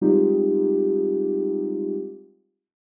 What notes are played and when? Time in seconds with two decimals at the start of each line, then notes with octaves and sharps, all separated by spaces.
0.01 G3 G#3 C4 D#4 F4 G4